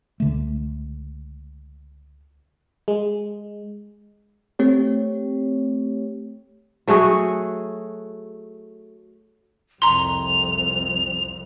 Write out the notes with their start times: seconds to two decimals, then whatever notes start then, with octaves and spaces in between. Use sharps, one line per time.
0.20 C#2 D3 A3
2.88 G#3
4.59 A3 C4 G4 C#5
6.87 F#3 A3 F#4 G#4
9.82 C2 F2 A#5 C6 F7